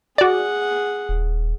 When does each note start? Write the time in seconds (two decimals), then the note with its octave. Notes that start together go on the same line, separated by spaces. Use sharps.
0.18 F#4 G#4 D5 F#5
1.09 D#1